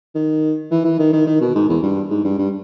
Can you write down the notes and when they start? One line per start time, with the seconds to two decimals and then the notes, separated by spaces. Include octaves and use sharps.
0.15 D#3
0.71 E3
0.84 E3
0.99 D#3
1.12 D#3
1.27 D#3
1.41 B2
1.55 G#2
1.69 E2
1.83 G2
2.10 G#2
2.24 G2
2.38 G2